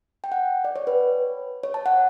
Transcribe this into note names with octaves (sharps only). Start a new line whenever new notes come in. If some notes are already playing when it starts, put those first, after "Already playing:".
G5
F#5
D5
C#5
B4
C#5
A5
F#5